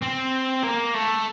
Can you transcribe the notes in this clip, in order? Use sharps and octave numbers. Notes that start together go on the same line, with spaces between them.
C4
A#3
A3